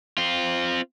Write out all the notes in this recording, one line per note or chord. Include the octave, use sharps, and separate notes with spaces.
C4 F4